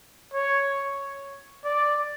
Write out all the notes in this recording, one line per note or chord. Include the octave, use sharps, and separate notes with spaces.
C#5
D5